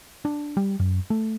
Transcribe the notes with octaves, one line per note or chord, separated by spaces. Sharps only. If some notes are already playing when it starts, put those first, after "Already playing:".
D4
G3
F#2
A3